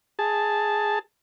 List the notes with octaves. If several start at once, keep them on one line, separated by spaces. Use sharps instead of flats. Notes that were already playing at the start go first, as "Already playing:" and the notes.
G#4 A5